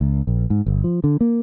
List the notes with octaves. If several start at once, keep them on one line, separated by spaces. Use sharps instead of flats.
C#2
A#1
G#2
G1
F3
D3
A#3